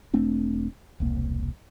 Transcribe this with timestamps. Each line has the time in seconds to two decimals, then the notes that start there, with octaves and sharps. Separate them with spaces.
0.14 E1 A3 C4 D4
1.00 E1 C2 A#3